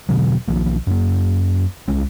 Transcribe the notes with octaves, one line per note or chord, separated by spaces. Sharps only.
E1 B2 D3 F#3
B1 D#3 F3 A#3
F#2 A#3
C2 G#3 C#4